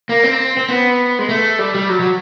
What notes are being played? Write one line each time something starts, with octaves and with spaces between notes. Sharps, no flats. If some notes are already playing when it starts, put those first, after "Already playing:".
A#3
C4
C4
B3
G#3
A3
G3
G3
F#3
F#3